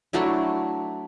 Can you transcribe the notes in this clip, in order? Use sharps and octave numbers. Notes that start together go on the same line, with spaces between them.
F#3 A3 D4 E4